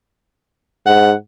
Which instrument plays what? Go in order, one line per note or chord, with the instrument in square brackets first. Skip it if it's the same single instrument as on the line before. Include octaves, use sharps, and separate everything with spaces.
[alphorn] G#2 [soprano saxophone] F#5